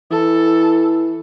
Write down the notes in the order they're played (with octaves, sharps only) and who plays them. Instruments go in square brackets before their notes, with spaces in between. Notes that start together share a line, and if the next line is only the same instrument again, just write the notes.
[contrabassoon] E3 [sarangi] A4